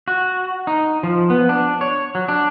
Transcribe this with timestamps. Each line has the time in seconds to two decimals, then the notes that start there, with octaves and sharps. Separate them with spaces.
0.08 F#4
0.67 D#4
1.03 F3
1.30 B3
1.49 D4
1.81 C#5
2.15 F#3
2.28 D4